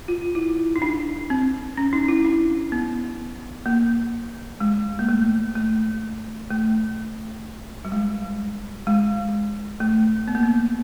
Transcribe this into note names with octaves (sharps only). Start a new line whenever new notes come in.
F4
E4
D#4
D4
C4
C#4
D#4
E4
D4
B3
A#3
G#3
A#3
A3
A3
A3
G3
G#3
G#3
A3
B3
A#3
B3